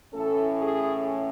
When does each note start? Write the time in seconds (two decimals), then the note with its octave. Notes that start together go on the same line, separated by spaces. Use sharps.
0.13 A2 E3 A3 C#4 A4
0.62 G#4